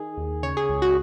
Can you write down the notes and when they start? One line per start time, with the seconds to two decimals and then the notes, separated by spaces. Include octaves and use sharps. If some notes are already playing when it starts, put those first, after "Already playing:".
Already playing: D#3 G#4
0.17 D#2
0.43 C#3 C#5
0.57 G#4
0.69 C#2
0.82 F#4